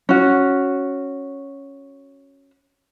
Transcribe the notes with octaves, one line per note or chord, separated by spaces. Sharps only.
C#4 F#4